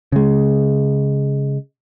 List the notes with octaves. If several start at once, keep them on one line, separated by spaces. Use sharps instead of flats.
C#3 G#3